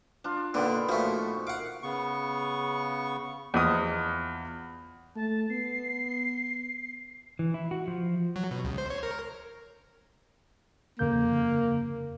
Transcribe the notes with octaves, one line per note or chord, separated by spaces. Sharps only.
D4 F4
A#2 D3 D#3 B3
A#2 F3 A3 F#4 C#6
F5 F#5 D6
C#3 B3 C#6
E2 F3 D#5 D#6
A3 A5
B3 C7
E3
E4
F#4
F3
F#3
B2
C#2
C5
C#5
A#4
F2 C#3 A#3 G6